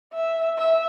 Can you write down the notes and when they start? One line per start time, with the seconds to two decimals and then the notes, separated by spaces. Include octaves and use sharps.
0.14 E5
0.58 E5